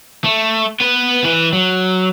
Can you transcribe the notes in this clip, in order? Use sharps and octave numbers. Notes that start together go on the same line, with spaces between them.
A3
B3 B4
E3 B4
F#3